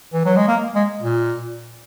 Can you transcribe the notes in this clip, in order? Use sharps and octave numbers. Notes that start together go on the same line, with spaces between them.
E3
F#3
G#3
A#3
G#3
A#2